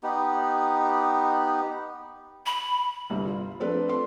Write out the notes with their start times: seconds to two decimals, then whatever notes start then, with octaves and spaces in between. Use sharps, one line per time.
0.03 B3 D#4 G4
2.46 B5
3.10 G1 C2
3.25 F4
3.60 F3 A3 C4 D4 A4 B4
3.89 C6